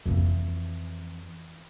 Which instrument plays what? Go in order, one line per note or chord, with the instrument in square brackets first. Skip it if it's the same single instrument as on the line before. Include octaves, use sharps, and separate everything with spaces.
[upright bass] F2 E3